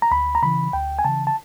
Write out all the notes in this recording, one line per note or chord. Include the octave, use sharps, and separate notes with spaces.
A#5
D2 B5
A#5
C#3 E3 B5
D2 G5
G#5
C#3 E3 A5
A5